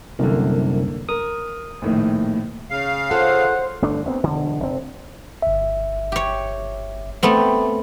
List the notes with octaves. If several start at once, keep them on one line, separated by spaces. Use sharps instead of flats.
C2 F#2 D3 A#3
A#4 D#6
A#1 A2 D#3
C#3 F5
F4 A4 C5 F#5
G1 A3 D4
D2 B3 C4
E1 D3
F1 C4
G1 E5
G4 C#5
A3 B3 C4